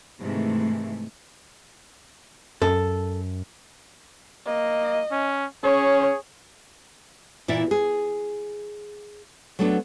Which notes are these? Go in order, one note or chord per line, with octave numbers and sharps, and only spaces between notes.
G#2 C3 D#3 E3 G#3 A3
F#2 A4
A#3 D#5
C#4
C#4 G#4 C#5
A#2 E3 E4 D5 E5
G#4
F#3 A3 B3 C4 D4